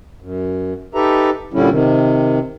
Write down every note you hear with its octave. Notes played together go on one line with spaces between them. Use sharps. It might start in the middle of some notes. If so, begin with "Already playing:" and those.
F#2
D#4 G4 A4 B4 E5 A#5
A#2 D3 G3 C#4 E4
C3 D#3